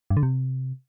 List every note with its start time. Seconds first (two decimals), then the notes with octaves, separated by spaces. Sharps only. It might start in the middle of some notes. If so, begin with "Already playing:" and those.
0.10 G2
0.17 D3
0.23 C3